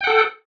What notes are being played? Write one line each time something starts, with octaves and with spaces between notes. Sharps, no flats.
A4 F#5 G5